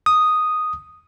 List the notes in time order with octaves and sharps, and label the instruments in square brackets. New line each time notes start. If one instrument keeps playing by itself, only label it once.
[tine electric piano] D#6